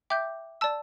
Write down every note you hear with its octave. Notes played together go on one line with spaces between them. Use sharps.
E5 G5 D6 G6
D5 A5 E6